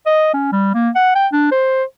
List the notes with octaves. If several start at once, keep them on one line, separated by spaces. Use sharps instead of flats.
D#5
C#4
G3
A#3
F#5
G5
D4
C5